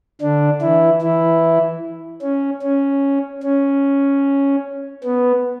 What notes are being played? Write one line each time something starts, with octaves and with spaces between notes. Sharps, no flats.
D3 D4
E3 E4
E3 E4
C#4
C#4
C#4
B3